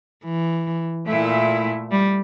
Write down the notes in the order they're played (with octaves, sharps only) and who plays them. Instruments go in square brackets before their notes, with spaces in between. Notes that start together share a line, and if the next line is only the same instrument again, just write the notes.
[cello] E3
[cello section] A#2 A3 E4
[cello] G3